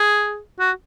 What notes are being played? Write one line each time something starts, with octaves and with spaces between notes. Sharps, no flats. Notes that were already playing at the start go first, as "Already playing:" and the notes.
Already playing: G#4
F#4